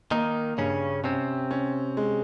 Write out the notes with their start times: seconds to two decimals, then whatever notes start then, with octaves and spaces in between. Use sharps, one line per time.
0.11 D#3 A#3 D#4
0.58 G2 C#3 C#4
1.04 C3 C4 C#4
1.51 C#4
1.97 G#3